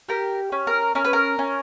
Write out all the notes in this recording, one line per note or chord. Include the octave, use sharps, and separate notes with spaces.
G4 A#4
C#4
A#4
C#4 A#4
B4
A#4
C#4